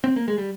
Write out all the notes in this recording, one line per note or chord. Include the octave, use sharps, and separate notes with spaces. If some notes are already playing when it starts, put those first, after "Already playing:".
C4
A#3
G#3
G3